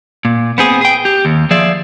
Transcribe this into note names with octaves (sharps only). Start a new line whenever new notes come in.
A#2
B3 C4 G#4
G#4 G5
G4
D#2
F3 G#4 D5 E5